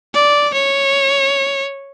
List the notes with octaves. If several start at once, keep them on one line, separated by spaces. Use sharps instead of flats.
D5
C#5